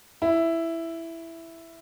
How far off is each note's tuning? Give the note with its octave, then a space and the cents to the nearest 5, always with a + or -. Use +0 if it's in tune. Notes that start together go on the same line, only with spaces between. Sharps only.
E4 +5